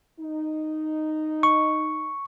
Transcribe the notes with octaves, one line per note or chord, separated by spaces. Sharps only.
D#4
C#6